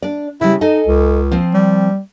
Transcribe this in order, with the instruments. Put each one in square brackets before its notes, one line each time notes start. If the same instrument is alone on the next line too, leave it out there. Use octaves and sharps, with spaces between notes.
[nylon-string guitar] D4 D5
[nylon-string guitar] C#3 G3 [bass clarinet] E4
[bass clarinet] D#4 [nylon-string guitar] A4 D#5 G#5
[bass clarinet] C#2
[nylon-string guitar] F3 C4
[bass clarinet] G3